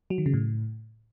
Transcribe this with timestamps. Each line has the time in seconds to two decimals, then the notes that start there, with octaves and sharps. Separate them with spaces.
0.10 F#3
0.18 D#3
0.26 C#3
0.33 A2